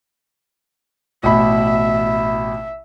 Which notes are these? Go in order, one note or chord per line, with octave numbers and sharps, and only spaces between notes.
A1 B2 E5 B5